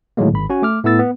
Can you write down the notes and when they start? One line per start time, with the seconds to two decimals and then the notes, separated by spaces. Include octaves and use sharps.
0.17 A2 D3 D#3 F#3 G#3 A#3
0.33 G#1 B5
0.50 C#4 F#4 G#5
0.62 A3 D6 F6
0.84 A2 A3 B3 E4 E6 A6
0.99 B3